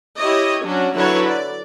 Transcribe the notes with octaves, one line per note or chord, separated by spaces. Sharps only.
E4 G4 C#5 D#5
F#3 C#4 D4 F#4
D3 F#3 E4 A4 B4 C#5
D5